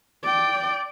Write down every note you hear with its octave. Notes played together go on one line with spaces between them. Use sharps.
D5 G5